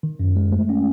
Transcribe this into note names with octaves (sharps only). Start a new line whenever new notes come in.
D#3
F#2
G#3
A3
C#4